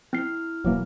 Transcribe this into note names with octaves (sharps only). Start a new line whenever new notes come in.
C4 E4 F6 C7
D1 B2 E3 F#3 A#3